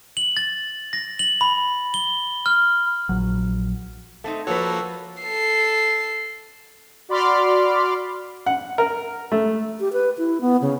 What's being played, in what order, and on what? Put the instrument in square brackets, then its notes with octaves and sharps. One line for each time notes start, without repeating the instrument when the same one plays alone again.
[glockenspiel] F#7
A6
A#6
F#7
B5
G7
F6
[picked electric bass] A#1 F#3
[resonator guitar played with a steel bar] A3 C4 D#4
[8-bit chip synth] F3 A#3 F#4 [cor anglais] A4 [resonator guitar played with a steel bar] B4 C#5
[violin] A4 C7
[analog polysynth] F#4 D5 B5 C6 D6 F6
[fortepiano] F#5
A#4
A3
[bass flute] G4
B4
E4
B3
C#3